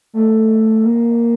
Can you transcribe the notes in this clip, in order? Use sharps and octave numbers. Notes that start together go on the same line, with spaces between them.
A3
A#3